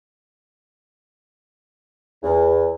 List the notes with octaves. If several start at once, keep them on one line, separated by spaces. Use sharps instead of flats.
E2